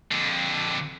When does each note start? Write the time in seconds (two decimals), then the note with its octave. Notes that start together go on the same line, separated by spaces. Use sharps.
0.12 F2 D3